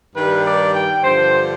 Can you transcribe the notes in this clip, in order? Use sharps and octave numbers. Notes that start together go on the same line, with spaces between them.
G2 D#3 G3 B4
D5
G5
G2 D3 F3 C5